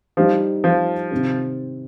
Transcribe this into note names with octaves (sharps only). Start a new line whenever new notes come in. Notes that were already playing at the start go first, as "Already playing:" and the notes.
F3 G3 D#4 G4 C5
F3
C3 D#3 C4